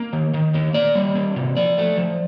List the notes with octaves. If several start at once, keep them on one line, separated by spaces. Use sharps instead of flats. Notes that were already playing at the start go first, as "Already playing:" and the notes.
Already playing: A#3 D#5
D#3
D#3
A#3
A#3 D5
G3
A#3
C3
F3 D5
A3
F3